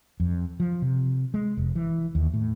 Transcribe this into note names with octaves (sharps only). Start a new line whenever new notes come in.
F2
F3
C3
G#3
F1
E3
D#2
A2